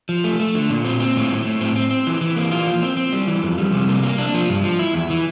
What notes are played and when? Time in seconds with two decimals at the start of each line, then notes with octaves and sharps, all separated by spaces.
0.09 F3
0.24 A3
0.40 A3
0.55 D3
0.70 A#2
0.85 C4
1.00 C4
1.16 A2
1.31 A2
1.45 A2
1.61 C4
1.76 C4
1.91 C4
2.07 E3
2.21 E3
2.36 A#3
2.52 F4
2.67 F3
2.82 C4
2.97 C4
3.13 G3
3.28 E3
3.43 F2
3.58 G3
3.72 C3
3.89 A#3
4.03 A#3
4.18 D4
4.34 F3
4.49 G2
4.64 F3
4.79 E4
4.94 E2
5.10 E3